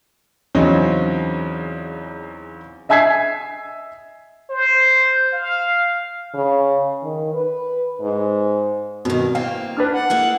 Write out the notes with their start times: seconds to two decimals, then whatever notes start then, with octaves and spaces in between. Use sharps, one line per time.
0.55 E2 C#3 F#3 C4 C#4 D#4
2.89 D#5 E5 G#5 G#6 B6 C7
4.50 C5
5.33 F5
6.34 C#3
7.03 D#3
7.34 B4
8.01 G#2
9.05 G2 B2 D#3
9.35 E3 A#3 C4 F5
9.77 D4 B4 F6
9.93 F#5
10.10 A#3 E4 G#4